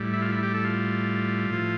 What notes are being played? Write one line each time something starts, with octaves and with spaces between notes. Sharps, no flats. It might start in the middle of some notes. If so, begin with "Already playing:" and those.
Already playing: A2 G3
E4
F4
E4
G4
A4
F4
A2 F3